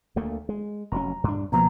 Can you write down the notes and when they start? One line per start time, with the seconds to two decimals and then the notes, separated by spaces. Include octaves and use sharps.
0.16 D2 A3 A#3
0.49 G#3
0.92 F1 F#3 C#4 A#5
1.24 G2 D4
1.52 C#2 B2 F3 A#3 B3 A#5